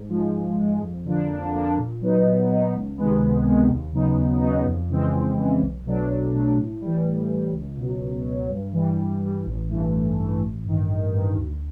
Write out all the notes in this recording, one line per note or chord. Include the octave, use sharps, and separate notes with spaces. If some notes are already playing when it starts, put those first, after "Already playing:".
Already playing: G#2
F3 G#3
G#2
F3 G#3
F2
D3 F3 A#3 D4
F2
D3 F3 A#3 D4
A#2
F#3 B3 D#4
A#2
F#3 B3 D#4
C#2
C3 D#3 G#3 B3
C#2
C3 D#3 G#3 B3
D#2
C#3 F#3 B3 D#4
D#2
C#3 F#3 B3 D#4
F2
C#3 E3 G#3 C4
F2
C#3 E3 G#3 C4
B1
B2 F#3 A3 D4
B1
B2 F#3 A3 D4
A2
E3 G3
A2
E3 G3
C#2
B2 F#3
C#2
B2 F#3
G2
E3 G3
G2
E3 G3
A1
G2 E3 A3
A1
G2 E3 A3
A1
G2 D#3
A1
G2 D#3
D2